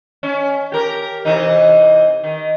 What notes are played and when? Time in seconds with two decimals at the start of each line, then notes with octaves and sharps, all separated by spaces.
0.23 C#4
0.72 G4 A#4
1.25 C3 E3 D#4
2.24 D#3